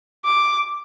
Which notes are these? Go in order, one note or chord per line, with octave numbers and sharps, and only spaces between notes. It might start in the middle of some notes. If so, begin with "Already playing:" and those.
D6